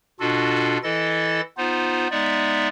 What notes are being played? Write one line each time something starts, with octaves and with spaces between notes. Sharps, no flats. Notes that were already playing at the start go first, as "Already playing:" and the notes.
B2 D4 F4 F#4 A4
E3 E4 A4 D#5 A6
B3 D#4 F4 C5
G#3 B3 D#4 D5 E5